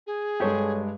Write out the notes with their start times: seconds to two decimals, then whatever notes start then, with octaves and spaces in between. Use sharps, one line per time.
0.07 G#4
0.40 G2 G#3 G4 A4 C#5